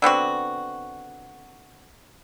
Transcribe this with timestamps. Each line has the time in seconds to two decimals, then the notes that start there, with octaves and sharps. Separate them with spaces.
0.02 D3 B3 C4 F#4